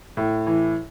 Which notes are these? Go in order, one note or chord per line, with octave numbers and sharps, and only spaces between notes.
A2
E3